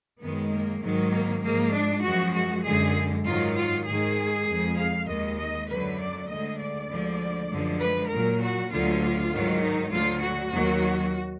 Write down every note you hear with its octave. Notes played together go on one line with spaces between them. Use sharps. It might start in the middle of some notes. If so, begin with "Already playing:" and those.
F#2 D#3 G#3 B3
A#3
G#2 D#3 F#3 G#3
A#3
G#2 F3 G#3 A#3
D4
F#2 F3 G#3 F#4
F#4
F#2 D3 G#3 G#4
G#2 D#3 F#3 F4
F4
G#2 D#3 G#3 G#4
F2 F3 G#3
F5
D#2 D#3 G#3 D#5
D#5
F#2 D3 F#3 B4
D5
D2 D3 G#3 D#5
D5
D2 D3 F3 G#3
F#2 D3 F3 G#3
B4
A#2 F#3 A#4
F#4
D2 D3 F#3 F4
G#2 D#3 F#3
D#4
D2 D3 F#3 F4
F#4
D#2 D#3 F#3